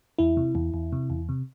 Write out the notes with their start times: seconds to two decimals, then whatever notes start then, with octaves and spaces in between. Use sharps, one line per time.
0.19 E2 E4
0.37 C3
0.55 E2
0.74 E2
0.92 C3
1.10 E2
1.29 C3